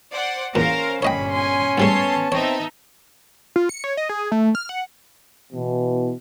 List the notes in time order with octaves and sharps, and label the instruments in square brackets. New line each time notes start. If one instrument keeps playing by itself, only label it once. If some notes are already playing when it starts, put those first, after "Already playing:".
[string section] C5 D5 F#5
[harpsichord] E2 A#2 [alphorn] C#4 [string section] A#4 C5 F5 [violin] A#5
[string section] G1 A#2 [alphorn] C#4 [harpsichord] C#5 D#5 G5 [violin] B5
[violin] G#5 C6
[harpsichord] G#2 G3 A3 [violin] B3 A5 [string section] A4 C#5 C6
[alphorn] C4 [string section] D#4 E5 [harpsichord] C#5
[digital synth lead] F4
C#7
C#5
D#5
G#4
A3
F6
F#5
[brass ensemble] B2 E3